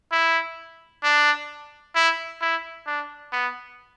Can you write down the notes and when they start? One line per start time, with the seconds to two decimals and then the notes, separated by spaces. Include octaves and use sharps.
0.12 E4
1.04 D4
1.95 E4
2.42 E4
2.87 D4
3.33 B3